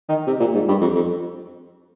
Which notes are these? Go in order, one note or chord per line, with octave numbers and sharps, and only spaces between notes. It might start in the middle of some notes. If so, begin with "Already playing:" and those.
D#3
C3
A#2
G#2
G2
F2
F2